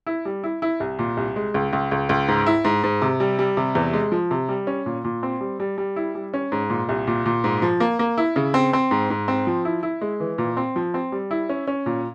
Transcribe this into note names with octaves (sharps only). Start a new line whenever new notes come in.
E4
G3
E4
E4
C2
A#2
C2
G#3
C#2
C#2
C#2
C#2
G#2
E4
G#2
G#2
C3
G3
G3
C3
E2
G#3
F3
C3
G3
C#4
A#2
A#2
C4
G3
G3
G3
E4
G3
C#4
G#2
A#2
C2
A#2
A#2
G#2
F3
A#3
A#3
E4
C#3
C4
C4
G#2
G#2
C4
F3
E4
E4
G#3
E3
A#2
C4
F3
C4
G3
E4
C#4
C#4
A#2